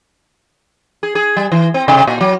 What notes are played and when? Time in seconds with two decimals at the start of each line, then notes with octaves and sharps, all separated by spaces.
1.03 G#4
1.15 G#4
1.37 G3
1.52 E3
1.74 C4
1.88 C3
2.07 A#2
2.21 F#3